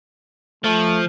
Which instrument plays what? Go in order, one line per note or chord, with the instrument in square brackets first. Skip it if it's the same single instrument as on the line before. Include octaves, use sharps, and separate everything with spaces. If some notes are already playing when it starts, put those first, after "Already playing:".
[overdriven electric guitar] F3 [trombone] A3